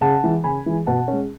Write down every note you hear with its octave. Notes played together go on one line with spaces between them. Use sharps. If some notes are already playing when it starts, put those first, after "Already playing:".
C#3 F#5 A5
E3 G#3
C#3 G#5 B5
E3 G#3
B2 F#5 A5
C#4
G#3